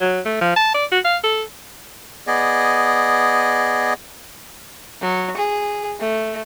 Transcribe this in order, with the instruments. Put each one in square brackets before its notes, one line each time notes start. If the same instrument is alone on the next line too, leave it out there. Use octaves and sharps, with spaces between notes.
[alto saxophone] F#3
A3
F3
A5
D5
F#4
F5
A4
[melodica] B3 G#4 D5 D#5
[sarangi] F#3
G#4
A3